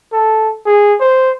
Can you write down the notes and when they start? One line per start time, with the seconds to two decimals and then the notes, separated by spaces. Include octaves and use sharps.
0.13 A4
0.66 G#4
1.00 C5